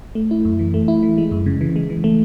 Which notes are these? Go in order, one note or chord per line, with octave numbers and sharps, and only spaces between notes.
A3
E4
F#2
E3
A3
E4
E3
G#3
F#2
C#3
E3
G#3
E3
A3